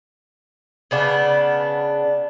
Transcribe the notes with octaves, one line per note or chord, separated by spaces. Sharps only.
C#3 B3 D4